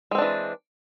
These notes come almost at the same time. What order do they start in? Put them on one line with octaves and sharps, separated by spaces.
G#3 C4 D4 E3